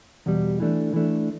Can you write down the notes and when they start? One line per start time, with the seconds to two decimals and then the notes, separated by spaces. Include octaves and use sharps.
0.26 E2 B2 G3
0.60 E3 A3 D4
0.94 E3 A3 D4